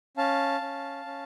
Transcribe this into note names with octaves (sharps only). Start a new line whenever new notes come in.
C#4 F5 A5
C#4
C#4